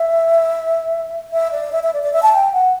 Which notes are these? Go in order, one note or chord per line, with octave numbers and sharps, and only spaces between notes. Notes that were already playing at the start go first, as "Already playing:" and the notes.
Already playing: E5
E5
D5
E5
E5
D5
D5
E5
A5
G5
F#5